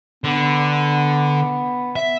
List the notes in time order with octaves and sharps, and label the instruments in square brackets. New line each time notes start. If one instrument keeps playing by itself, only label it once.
[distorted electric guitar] D3 [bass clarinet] B3
[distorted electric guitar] E5